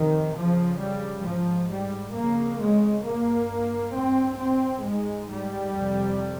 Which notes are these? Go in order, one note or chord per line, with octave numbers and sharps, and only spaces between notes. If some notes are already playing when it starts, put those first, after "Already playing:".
Already playing: F2 C3 D#3
F2 C#3 F3
G3
G#2 F3
G3
F2 C#3 A#3
G#3
G2 A#3
G2 C4
C4
G#2 G#3
G3
F2 C3